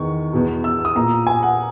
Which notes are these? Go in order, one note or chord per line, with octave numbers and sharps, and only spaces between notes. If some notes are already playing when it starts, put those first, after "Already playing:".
Already playing: E2 D#3 C#6
E2 B2
E6
D#6
A#2 A#5
G#5
F#5